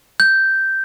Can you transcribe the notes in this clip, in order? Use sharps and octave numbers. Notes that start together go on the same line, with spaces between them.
G6